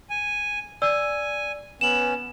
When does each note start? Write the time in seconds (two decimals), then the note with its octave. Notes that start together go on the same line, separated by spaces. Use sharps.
0.10 G#5
0.82 D5 G#5 E6
1.81 B3 C#4 E7 F#7